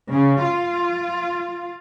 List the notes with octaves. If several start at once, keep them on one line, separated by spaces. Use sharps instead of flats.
C#3
F4